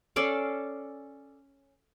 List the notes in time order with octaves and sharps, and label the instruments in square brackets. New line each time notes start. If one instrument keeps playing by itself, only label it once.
[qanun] C#4 A4 D5 F5